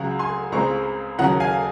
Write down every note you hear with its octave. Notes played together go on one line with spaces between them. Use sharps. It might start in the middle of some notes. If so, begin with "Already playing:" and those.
Already playing: C#2 C#3 F#3 F#5 A#5
G#5 C6
C#2 C#3 G#3 C4 A#5 C#6
D#2 C#3 F#3 C#4 F#5 A#5
F5 G#5